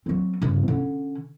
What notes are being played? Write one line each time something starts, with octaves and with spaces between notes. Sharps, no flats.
F#3 C4
G2 C#3
D3 C#4